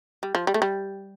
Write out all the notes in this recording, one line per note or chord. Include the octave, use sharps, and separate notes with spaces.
G3
F3
G3
A3
G3